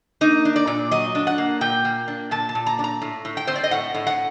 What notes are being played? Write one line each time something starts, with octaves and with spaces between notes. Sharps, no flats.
A#3 D#4
D4
D5
A#2
F#3 D#5
D4
F#5
A#3
A#2 G5
A#3
D4
A#2 A5
A5
A#2
A#5
D4
A#5
A2
A2
G5
C4 C5
D5
D#5
A2 F#5
A2
F#5